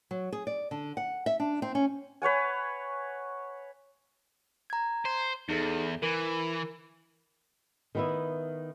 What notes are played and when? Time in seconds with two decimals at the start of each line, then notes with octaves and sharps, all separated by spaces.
0.11 F#3
0.32 G#4
0.47 D5
0.71 D3
0.97 F#5
1.26 E5
1.40 D4
1.62 C4
1.75 C#4
2.22 B4 C#5 F#5 G#5
4.70 A#5 G#6
5.05 C5
5.49 E2 D#4 G#4 A4
6.02 E3 A#4
7.95 D#3 B3 E4